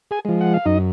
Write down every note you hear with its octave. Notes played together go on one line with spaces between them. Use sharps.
G#4 G#5
F3 G#3
F#5
F5
F#2 D#4 D#5